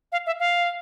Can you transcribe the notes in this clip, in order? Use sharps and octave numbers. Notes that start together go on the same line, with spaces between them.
F5
E5
F5